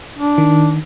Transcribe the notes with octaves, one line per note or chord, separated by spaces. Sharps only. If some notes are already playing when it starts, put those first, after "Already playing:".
D4
D#3